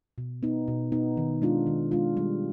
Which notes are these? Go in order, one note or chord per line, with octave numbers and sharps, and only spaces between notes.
B2
B3 D#4
B2
B3 D#4
D#3
G#3 D4 F4
D#3
G#3 D4 F4
G3